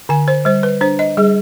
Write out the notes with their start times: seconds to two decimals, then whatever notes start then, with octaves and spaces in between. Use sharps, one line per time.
0.09 D3 G#5
0.28 C5
0.45 G3 C5
0.63 B4
0.81 D4 C5
0.99 D#5
1.17 G3 G#4